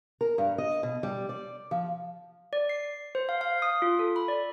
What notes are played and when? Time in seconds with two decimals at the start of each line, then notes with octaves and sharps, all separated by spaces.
0.21 A#4
0.38 G2
0.58 D#5
0.83 B2
1.03 G3
1.29 D5
1.71 F3
2.53 D5
2.69 C7
3.15 C5
3.29 F5
3.41 F5
3.62 D#6
3.82 F4
3.99 A4
4.16 B5
4.28 D5